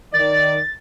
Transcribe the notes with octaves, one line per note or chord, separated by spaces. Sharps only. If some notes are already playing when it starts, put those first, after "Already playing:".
D#3 D5 A6